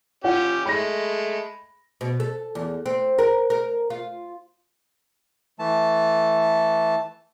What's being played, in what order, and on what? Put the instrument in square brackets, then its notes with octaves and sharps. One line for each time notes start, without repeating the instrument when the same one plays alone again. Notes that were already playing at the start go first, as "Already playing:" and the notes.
[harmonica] C#4 G4 [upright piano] F4 C#5 F#5
[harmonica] G#3 A3 [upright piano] B5 A#6
[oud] B2
A4
E2
C4
A#4
A#4
F4
[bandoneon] E3 A3 A5